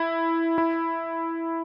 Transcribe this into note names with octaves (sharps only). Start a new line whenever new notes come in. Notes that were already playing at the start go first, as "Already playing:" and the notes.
Already playing: E4
E4